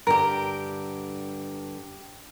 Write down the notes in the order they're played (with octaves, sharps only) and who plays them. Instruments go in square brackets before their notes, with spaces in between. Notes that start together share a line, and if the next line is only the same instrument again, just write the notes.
[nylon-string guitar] G2 D3 [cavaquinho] G4 A#4